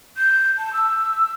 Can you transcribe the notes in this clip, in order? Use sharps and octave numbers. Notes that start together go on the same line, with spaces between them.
G6
A5
E6